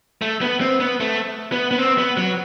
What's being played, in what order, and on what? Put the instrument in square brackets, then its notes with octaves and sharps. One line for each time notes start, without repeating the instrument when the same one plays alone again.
[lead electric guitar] A3
B3
C4
B3
A3
B3
B3
C4
B3
F#3